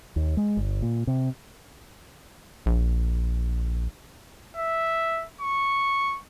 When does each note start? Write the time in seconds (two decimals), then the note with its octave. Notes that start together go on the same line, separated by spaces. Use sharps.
0.16 D#2
0.37 G#3
0.57 G1
0.82 A#2
1.07 C3
2.66 A#1
4.57 E5
5.41 C#6